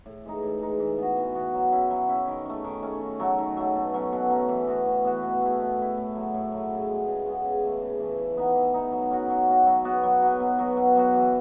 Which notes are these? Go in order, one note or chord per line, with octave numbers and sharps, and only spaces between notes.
A2
E3 G#3 D#4
A2
E3 G#3 D#4
E3
B3 F#4
E3
B3 F#4
F#3
C#4 E4
F#3
C#4 E4
D#3
A3 C#4
D#3
A3 C#4
D#3
F#3 A3
D#3
F#3 A3
B2
F#3 C#4
B2
F#3 C#4
E3
B3 F#4
E3
B3 F#4
B2
A3 E4
B2
A3 E4
A2
F#3 A3
A2
F#3 A3
C#3
G#3 B3
C#3
G#3 B3
C#3
E3 A3
C#3
E3 A3
E3
B3 D#4
E3
B3 D#4
F#3
C#4 F#4
F#3
C#4 F#4
F#3
B3 F#4
F#3
B3 F#4
B2
F#3 B3 F#4
B2
F#3 B3 F#4
E3